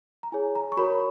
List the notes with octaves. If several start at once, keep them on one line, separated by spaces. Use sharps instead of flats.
A#5
E4 G#4 C#5 G#5
A#5
C#6
F#4 A#4 C#5 B5